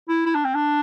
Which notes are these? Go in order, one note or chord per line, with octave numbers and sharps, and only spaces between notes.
E4
E4
D4
C4
D4